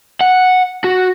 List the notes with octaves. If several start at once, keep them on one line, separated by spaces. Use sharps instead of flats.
F#5
F#4